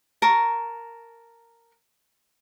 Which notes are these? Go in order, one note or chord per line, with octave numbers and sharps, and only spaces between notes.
A#4 A5 C#6